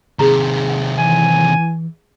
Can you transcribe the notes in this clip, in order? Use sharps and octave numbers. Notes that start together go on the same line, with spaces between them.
C3 D#3 G#4 A#5
F#5
E3 G#5